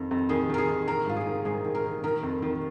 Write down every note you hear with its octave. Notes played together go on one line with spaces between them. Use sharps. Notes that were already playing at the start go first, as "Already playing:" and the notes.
Already playing: F2 D#3
F2
D#3 G#4
D#3 A#4
G#4
D#3
D#3 A#4
G#2 F4
G#4
D#3
G#2 G#4
D#3
A#4
D#3
D#3 A#4
F2
D#3